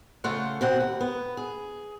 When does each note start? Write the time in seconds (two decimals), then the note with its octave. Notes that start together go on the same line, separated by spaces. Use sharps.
0.24 C#3 A3 F4 F#5
0.61 B2 C4 F#5
0.80 D#2
1.01 B3
1.37 G#4